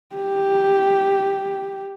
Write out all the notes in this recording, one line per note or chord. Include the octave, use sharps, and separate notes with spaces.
G4